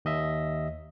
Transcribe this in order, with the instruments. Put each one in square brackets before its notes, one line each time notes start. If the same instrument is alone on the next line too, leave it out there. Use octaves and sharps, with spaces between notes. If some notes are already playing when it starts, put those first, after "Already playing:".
[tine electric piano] D#2 D#5 E5